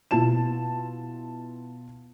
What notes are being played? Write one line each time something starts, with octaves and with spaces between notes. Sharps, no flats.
B2 E4 F4 A5 E7